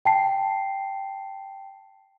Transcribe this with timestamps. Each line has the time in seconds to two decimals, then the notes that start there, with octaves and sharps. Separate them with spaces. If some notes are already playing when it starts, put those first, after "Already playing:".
0.05 G5 A5 C7